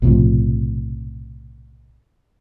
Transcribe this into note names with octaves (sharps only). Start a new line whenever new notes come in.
B1 A2 C3 F3